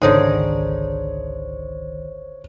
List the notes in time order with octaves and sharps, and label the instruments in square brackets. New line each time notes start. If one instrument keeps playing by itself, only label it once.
[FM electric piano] G#1 C#2 D#3 [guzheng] D3 D#4 G#4 [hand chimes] C5 [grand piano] C#5